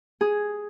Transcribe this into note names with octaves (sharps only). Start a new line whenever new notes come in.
G#4